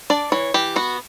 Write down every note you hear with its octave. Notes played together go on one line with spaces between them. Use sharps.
D4 D5
E3 C#5
E3 G4
B3 F#4